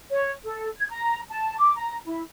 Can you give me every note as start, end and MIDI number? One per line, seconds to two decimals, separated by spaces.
0.10 0.31 73
0.43 0.67 69
0.78 0.88 92
0.90 1.20 82
1.29 1.55 81
1.57 1.74 86
1.76 1.97 82
2.06 2.21 64